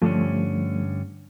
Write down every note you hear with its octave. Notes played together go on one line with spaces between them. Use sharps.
G2 D3 F3 A3 C#4